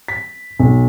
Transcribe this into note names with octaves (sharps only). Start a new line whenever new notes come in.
B6
B1